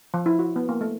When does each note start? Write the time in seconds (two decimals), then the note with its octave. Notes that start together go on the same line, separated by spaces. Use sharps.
0.14 F3
0.26 E4
0.39 F#4
0.56 B3
0.69 A#3
0.81 A3